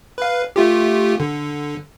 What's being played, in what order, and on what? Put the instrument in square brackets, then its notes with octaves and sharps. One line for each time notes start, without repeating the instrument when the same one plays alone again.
[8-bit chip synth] B4 F5
A3 F4 G4
D3